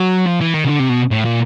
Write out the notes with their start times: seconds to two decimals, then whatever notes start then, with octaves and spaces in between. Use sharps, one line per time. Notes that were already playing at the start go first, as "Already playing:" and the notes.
Already playing: F#3
0.26 F3
0.40 E3
0.54 D#3
0.65 C#3
0.69 D3
0.79 C3
0.89 B2
1.11 A2
1.25 A#2